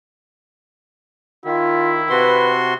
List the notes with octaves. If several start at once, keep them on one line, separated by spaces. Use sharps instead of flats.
D#3 E4 F4
C3 F#4 B4 C6